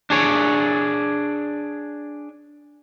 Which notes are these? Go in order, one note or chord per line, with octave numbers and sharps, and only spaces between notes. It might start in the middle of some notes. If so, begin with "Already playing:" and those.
D4 G#4 C#5